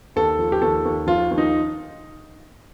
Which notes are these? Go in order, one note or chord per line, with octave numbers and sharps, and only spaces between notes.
D#2 A4
F3
G4
D#2 A4
D#2
F3 F4
D#2
D#4